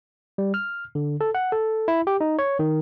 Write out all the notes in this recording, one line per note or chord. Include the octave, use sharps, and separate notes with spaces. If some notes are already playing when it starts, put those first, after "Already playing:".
G3
F6
D3
A4
F#5
A4
E4
G4
D#4
C#5
D#3